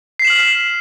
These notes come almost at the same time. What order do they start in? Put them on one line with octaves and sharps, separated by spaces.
C7 B6 E7 F#7 F6